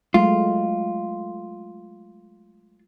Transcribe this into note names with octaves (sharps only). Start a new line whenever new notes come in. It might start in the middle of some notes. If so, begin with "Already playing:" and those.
F#3 G#3 A3 F4